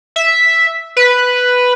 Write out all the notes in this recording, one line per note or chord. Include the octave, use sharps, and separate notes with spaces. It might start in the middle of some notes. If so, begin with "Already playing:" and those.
E5
B4